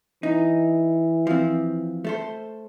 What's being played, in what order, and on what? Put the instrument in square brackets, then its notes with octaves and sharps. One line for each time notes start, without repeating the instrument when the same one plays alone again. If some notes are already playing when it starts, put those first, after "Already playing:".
[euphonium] E3 [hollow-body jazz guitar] D#4
[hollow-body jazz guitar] F3 C4
A3 A4 C5